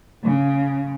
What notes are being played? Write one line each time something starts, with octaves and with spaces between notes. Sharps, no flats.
C#3